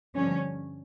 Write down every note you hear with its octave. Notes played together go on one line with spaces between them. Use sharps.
G2 D3 F3 C#4